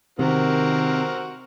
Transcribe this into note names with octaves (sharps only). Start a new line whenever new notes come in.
C3 D#3 C4 F#4 A#4